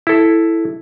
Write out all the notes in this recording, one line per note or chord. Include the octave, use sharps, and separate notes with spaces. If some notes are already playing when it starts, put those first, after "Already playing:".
E4 A4